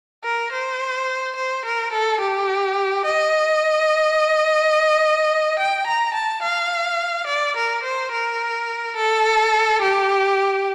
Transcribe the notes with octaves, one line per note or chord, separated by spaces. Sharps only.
A#4
C5
C5
A#4
A4
G4
D#5
G5
A#5
A5
F5
D5
A#4
C5
A#4
A4
G4